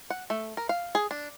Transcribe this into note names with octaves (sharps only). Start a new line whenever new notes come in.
F#5
A3
A#4
F5
G#4
D4